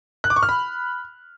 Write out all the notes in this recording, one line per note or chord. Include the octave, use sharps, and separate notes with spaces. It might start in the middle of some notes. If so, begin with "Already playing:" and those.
F#6
D6
C#6
F6
B5